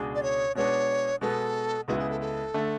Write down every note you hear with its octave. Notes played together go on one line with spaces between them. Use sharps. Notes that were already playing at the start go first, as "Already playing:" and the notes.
Already playing: C#2 B2 G#3 D4 G#4
D5
C#5
B2 G#3 B3 D4 C#5
B2 G#3 B3 A4
C#2 C#3 G#3 B3 E4 F#4
G#4
A4
A4
D3 A3